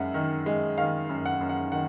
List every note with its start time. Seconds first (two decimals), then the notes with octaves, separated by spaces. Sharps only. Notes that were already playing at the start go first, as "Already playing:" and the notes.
Already playing: F#2 G#3 E5 F#5
0.14 D#3
0.46 G#3
0.78 D#3 F5
1.09 F#2
1.26 F#5
1.41 F#2
1.49 F#5
1.72 D#3 F#5